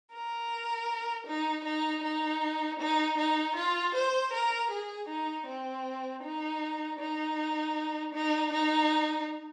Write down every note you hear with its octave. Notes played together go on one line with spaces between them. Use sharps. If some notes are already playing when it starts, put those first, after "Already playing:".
A#4
D#4
D#4
D#4
D#4
D#4
F4
C5
A#4
G#4
D#4
C4
D#4
D#4
D#4
D#4